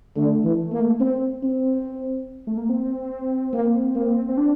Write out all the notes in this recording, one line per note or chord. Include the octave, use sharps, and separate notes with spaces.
D3 A3
E3
A#3
C4
C4
A3
A#3
C4
A#3
A#3
C4
D4